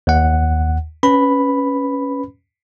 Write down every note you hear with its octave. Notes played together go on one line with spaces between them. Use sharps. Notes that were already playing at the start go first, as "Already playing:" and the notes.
D#2 F#5
C#4 B4 B5